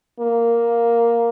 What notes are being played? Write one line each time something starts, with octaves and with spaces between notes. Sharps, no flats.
A#3